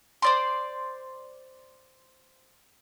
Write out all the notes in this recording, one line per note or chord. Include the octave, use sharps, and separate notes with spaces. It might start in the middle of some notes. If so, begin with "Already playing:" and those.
C5 D5 C6